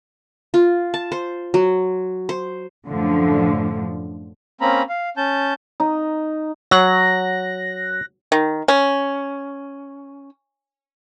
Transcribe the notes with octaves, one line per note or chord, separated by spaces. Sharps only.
F4
A5
C5
F#3
C5
F#2 A2 D3 F3
A#3 C4 C#4 A#5 B5
F5
C#4 A5 G6
D#4
F#3 F#6 A#6
D#3
C#4